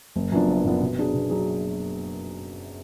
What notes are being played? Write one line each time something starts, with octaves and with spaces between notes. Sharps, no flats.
F#1
F#2 F3 B3 D4
F#1
F#2 F3 B3 D4
B2
F#3 D4 G#4
B2
F#3 D4 G#4